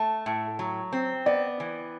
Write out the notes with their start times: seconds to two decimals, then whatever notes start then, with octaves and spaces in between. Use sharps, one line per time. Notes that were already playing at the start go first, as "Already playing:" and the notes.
Already playing: A3 A5
0.26 A2
0.59 F#3
0.93 C4
1.26 B3 D5
1.60 E3